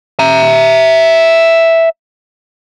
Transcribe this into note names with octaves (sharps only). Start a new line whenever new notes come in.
E5 A#5